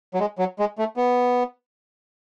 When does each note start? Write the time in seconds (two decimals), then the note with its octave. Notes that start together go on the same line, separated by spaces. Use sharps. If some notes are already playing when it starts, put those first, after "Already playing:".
0.14 F#3
0.20 G#3
0.39 F#3
0.59 G#3
0.78 A3
0.97 B3